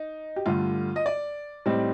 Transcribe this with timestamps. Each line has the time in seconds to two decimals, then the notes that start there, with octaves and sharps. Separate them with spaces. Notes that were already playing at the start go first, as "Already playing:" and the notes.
Already playing: D#4
0.36 G4
0.46 G2 D3 A3 F4
0.96 D#5
1.06 D5
1.66 A2 G3 C4 D#4